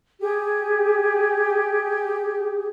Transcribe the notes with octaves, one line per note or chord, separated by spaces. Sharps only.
G4 G#4